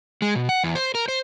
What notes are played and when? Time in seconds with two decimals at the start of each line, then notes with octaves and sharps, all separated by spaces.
0.22 G#3
0.35 B2
0.49 F#5
0.64 E2
0.75 C5
0.95 A#4
1.08 C5